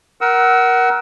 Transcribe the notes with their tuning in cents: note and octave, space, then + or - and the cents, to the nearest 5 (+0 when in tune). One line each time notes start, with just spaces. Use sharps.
A#4 +20 F#5 +20 E6 -20